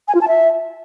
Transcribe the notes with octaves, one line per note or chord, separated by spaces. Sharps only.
G#5
F4
A5
E5